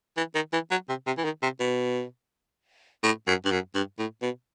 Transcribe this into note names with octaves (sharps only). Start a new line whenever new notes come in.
E3
D#3
E3
F#3
C3
C3
E3
D#3
C3
B2
A2
F#2
G2
F#2
G2
A2
B2